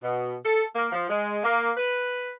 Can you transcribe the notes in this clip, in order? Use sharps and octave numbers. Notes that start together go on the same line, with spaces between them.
B2
A4
A#3
F3
G#3
A#3
B4